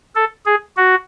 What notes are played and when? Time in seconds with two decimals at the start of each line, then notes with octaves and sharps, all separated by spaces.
0.16 A4
0.46 G#4
0.77 F#4